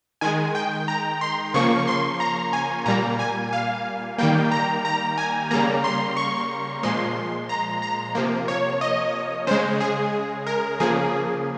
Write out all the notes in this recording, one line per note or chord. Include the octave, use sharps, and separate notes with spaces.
D#3 G#3 G#5
G5
A#5
C6
C#3 F3 A#3 C#6
C6
A#5
G#5
A#2 G3 A#3 A#5
G#5
F5
D#3 G3 A#3 G5
A#5
A#5
G#5
C#3 G3 A#3 A#5
C6
C#6
A#2 F3 G#3 C6
A#5
A#5
C3 F3 A#3
C#5
D#5
C#3 G#3 C5
G#4
A#4
C#3 F3 A#3 G#4